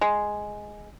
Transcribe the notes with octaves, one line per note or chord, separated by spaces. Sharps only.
G#3